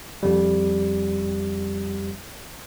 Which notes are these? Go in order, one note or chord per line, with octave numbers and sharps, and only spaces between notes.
F2 G3